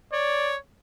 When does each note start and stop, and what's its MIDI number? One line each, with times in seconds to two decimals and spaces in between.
0.13 0.56 73
0.13 0.55 74